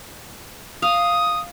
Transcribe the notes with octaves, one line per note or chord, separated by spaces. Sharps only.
F5 D#6